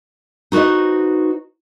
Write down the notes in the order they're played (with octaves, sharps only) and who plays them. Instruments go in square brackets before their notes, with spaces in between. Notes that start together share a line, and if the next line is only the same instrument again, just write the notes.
[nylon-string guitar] D#4 F#4 B4 C5 D#5